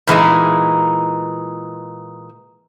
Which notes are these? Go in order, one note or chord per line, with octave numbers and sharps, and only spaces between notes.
A#2 E3 G#3 D#4